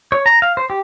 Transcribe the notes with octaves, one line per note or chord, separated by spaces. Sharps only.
C#5
A#5
F5
C5
G4